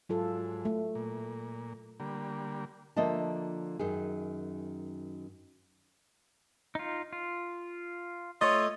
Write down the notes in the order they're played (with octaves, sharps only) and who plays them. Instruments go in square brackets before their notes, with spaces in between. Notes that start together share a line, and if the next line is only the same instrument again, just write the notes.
[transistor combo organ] G#2 [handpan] F#3 F4 A4
[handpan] A3
[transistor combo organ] A#2
D3 G3 A#3
[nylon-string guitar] D3 F3 A#3 D#5 E5 A5
F#2 D#3 G#4
[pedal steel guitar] D#4 F4
F4
[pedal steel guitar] A3 [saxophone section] F4 C#5 D#5